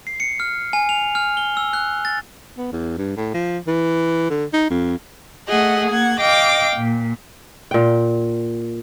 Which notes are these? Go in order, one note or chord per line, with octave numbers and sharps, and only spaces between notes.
C7
C#7
F6
G#5
F7
F6
G7
E6
F#6
A6
B3
E2
G2
A2
F3
E3
D3
D#4
F2
A3 G#4 D#5 F#5
A#3 F#5 G#6
D#5 F5 G5 D6
A#2
A#2 G5